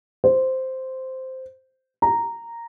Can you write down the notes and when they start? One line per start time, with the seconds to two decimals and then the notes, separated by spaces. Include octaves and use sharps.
0.24 C5
2.02 A#5